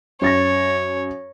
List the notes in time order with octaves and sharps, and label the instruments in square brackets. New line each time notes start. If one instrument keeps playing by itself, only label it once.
[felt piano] F#2 A6 A#6 [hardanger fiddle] C#5